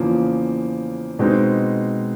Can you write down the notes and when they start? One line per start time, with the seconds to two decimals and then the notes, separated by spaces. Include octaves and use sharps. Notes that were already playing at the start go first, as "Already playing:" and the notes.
Already playing: E2 C#3 F3 A#3
1.19 B2 G#3 C4 D#4